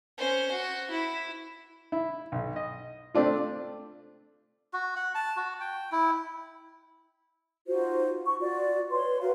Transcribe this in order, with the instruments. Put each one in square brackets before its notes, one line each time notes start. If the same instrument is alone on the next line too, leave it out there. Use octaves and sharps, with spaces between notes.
[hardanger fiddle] C#4 C5
F#4
E4
[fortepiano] E4
B1
D#5
A3 C4 D4 F4
[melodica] F#4
F#5
A5
F#4
G5
E4
[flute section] D#4 F4 F#4 C5
C#6
F4 F#4 D5
B4 C#5 C6
F#4 A#4 B4 F5